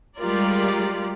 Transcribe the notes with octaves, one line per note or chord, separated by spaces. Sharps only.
G3 G#3 F4 G4 A#4 D5